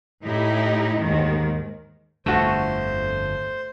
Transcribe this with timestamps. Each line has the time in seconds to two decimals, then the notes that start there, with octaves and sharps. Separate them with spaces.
0.24 A2 D#4 E4 G4
0.98 D#2 G#2 D#3
2.26 G1 F2 D3 A3 F#4 A4 C5